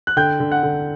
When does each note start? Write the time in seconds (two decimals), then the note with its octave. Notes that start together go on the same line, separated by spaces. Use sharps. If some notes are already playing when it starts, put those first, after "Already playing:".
0.07 F#6
0.17 D3 G5 G6
0.40 D3
0.51 F#5 F#6
0.63 D3